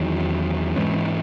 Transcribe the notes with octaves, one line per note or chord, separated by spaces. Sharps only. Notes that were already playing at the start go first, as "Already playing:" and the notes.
Already playing: E2 D#3 F#3
G#2 E3 G#3 C#4